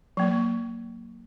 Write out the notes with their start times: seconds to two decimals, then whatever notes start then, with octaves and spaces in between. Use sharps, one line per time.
0.17 F#3 A#3